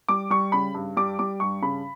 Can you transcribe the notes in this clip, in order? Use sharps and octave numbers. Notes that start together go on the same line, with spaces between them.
G3 D6
G3 C#6
C#3 B5
G2
G3 D6
G3 D6
G2 C#6
C#3 B5